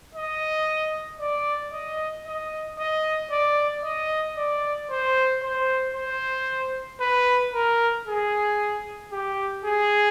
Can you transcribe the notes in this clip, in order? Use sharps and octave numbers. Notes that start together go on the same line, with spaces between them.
D#5
D5
D#5
D#5
D#5
D5
D#5
D5
C5
C5
C5
B4
A#4
G#4
G4
G#4